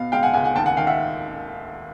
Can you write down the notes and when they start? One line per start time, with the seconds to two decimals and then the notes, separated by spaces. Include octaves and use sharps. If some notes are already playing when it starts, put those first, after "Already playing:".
Already playing: B2 B3 F5
0.12 G#3 F5 G5
0.23 F#5 G#5
0.34 C#2 F#5 G#5
0.44 F#5 G#5
0.55 D#2 G5 A5
0.66 F#5 G#5
0.77 D#3 F5 G5
0.87 E5 F#5